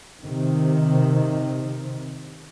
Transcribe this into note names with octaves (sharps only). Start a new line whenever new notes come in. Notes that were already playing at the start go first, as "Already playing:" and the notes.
C3 D#3